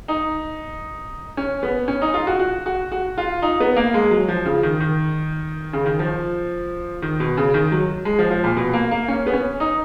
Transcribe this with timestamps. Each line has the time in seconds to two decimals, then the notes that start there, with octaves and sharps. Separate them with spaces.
0.08 D#4
1.37 C#4
1.63 B3
1.88 C#4
2.02 D#4
2.14 F4
2.27 F#4
2.39 F#4
2.66 F#4
2.92 F#4
3.18 F4
3.42 D#4
3.60 B3
3.76 A#3
3.94 G#3
4.11 F#3
4.28 F3
4.46 C#3
4.63 D#3
4.80 D#3
5.73 C#3
5.86 D#3
5.99 F3
7.02 D#3
7.20 B2
7.37 C#3
7.54 D#3
7.72 F#3
8.05 G#3
8.19 F3
8.31 F3
8.44 A#2
8.57 B2
8.73 A#3
8.91 A#3
9.08 C#4
9.27 B3
9.33 C#4
9.60 D#4